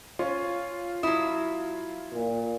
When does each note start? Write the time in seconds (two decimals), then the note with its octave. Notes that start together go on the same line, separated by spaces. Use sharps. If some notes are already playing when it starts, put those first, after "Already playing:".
0.19 C#4 F4
1.03 F#3 E4 D#6
2.13 A#2